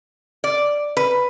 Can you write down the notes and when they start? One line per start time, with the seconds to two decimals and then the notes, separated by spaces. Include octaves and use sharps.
0.44 D5
0.97 B4